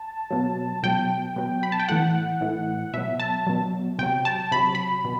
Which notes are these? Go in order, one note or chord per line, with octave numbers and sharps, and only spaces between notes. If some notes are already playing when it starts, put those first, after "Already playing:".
Already playing: A5
B2 F#3
B2 F#3 G5
B2 F#3
B5
A5
G5
A2 E3 F#5
A2 E3
B2 F#3 E5
A5
B2 F#3
C3 F#3 G5
A5
C3 F#3 B5
B5
B2